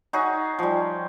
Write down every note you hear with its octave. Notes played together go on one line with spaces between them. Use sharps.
D#4 F#4 G#4 C#5
F3 G3